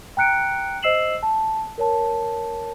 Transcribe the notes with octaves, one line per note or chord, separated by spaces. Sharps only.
G5 A#5 F#6 C#7 D7
C5 D#5 E6 C7 E7 F#7
A5
A#4 C#5 A5